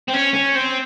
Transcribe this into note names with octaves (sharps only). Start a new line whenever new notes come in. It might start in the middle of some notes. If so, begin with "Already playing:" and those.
C4
C#4
C#4
C4